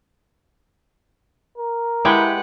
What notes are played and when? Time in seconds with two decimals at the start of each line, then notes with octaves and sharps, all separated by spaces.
1.58 A#4
2.05 G#3 E4 G4 B4 F#5 G5